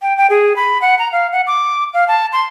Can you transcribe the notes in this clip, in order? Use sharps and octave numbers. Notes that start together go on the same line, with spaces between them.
G5
G5
G#4
B5
F#5
A#5
F5
F#5
D6
F5
A5
C6